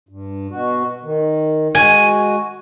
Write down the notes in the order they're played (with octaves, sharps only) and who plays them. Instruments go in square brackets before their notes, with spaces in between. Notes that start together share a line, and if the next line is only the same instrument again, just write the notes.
[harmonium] G2
B2 F#4
D#3
[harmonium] G#3 F#4 [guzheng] G#5